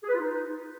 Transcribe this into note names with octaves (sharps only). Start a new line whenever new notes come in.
G#4
B4
F4
D#4